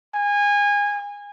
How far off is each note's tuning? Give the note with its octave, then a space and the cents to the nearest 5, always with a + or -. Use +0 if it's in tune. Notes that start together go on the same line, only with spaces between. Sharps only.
G#5 -25